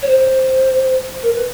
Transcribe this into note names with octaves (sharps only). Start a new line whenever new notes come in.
C#5
C5
A#4
B4